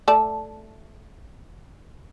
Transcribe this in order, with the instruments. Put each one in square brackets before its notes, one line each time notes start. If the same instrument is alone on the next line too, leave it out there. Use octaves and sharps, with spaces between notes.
[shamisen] A3 D5 A5